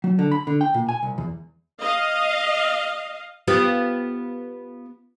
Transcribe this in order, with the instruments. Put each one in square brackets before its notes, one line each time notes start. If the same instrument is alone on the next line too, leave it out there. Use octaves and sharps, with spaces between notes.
[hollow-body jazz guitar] F#3
D3
B5
D3
G5
A#2
G#5
C2
E2
[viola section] D#5 F5
[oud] B3 F4 G4